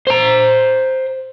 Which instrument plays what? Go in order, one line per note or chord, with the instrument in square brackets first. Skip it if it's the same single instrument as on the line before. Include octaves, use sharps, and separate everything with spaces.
[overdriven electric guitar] C5 A#5